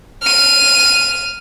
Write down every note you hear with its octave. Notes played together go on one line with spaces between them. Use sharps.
F6 D#7